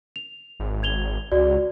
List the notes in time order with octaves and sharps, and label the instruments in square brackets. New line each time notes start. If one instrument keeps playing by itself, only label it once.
[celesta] F7
[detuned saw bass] G#1
[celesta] G#6 F7 G7
[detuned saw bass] C#2 [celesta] F#4 D5